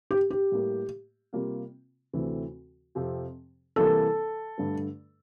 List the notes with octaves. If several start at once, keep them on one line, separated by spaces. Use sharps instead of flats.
G4
G4
A2 G3 A#3
C3 G3 A#3 F4
D2 C3 E3 A3 C4
F2 C3 F3 C4 G4
C3 E3 G3 A#3 A4
G2 D3 A3